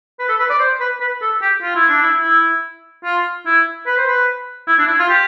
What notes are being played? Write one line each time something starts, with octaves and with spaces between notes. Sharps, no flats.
B4
A4
B4
D5
C5
B4
B4
A4
G4
F4
E4
D4
E4
E4
F4
E4
B4
C5
B4
E4
D4
E4
F4
G4